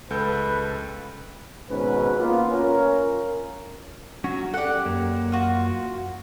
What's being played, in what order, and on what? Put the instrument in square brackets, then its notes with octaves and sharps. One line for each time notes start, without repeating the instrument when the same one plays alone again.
[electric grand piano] C#2 A4 G6 [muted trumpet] B4
[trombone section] G#1 G#2 B2 C#4 B4
A#3 B3 F4
C#4 F4 A#4
[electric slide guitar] F#3 C#4 [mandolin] F#4
[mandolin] G4 F#5 [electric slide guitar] A4 D5
[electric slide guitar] F#2 A#3
[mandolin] F4 F#4